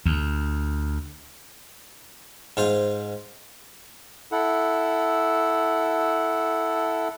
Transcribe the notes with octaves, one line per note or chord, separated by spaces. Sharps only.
D2
G#2 F4 C5
E4 A4 F#5